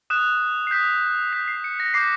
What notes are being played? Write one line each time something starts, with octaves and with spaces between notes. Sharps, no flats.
D#6 F#6 E7
C7
D#6 G6 B6
D#6 G6 B6
C7
C#7
A#6
D6 G6 C7